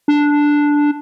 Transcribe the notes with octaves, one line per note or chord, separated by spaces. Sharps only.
D4